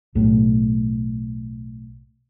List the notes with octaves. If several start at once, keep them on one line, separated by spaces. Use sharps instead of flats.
B1 A2